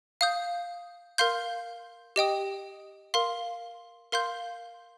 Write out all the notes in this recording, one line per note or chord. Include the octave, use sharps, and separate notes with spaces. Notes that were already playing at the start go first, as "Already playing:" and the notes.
F5 D#6 G6
A#4 F5 C6 G6
G4 D#5 G5 D#6
A#4 F5 C6
A#4 F5 C6 G6